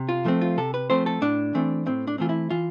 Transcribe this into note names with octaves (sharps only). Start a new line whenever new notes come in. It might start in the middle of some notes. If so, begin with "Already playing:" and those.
Already playing: C3
F4
F3 A3 C4
F4
C3 A4
B4
F3 A3 C4 C5
A4
A2 D4
E3 A3 C4
A2 C4
D4
E3 A3 C4 F4
E4
E3 F4